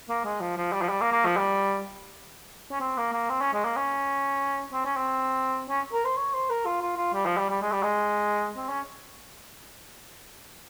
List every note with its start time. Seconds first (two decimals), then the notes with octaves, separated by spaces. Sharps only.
0.09 A#3
0.25 G#3
0.41 F3
0.57 F3
0.72 G3
0.82 F3
0.89 G3
1.01 A#3
1.12 A#3
1.26 F3
1.37 G3
2.72 C#4
2.80 C4
2.97 A#3
3.12 A#3
3.29 C4
3.41 C#4
3.54 G#3
3.64 A#3
3.77 C#4
4.73 C4
4.85 C#4
4.97 C4
5.69 C#4
5.93 A#4
6.05 C5
6.17 C#5
6.34 C5
6.50 A#4
6.66 F4
6.82 F4
6.97 F4
7.13 G3
7.26 F3
7.37 G3
7.50 G3
7.62 G#3
7.72 G3
7.83 G#3
8.57 C4
8.69 C#4